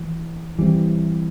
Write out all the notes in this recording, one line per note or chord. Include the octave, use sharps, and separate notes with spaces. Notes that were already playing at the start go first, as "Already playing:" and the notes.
Already playing: E3
E3 G3 C4